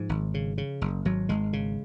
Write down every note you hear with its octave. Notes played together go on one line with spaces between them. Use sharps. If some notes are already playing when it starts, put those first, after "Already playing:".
Already playing: G#2 F3
G#1
C#3
C#3
F#1
G#1 F#3
G#1 G#3
C#3